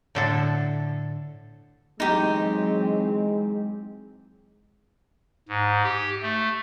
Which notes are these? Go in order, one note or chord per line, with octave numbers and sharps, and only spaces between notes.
A2 D3 A4
E3 F#3 G#3 C4 D#4 G4
G#2
G4
A3